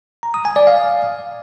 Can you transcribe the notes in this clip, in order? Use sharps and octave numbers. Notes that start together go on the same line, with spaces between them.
A#5
D#6
G#5
D5
F5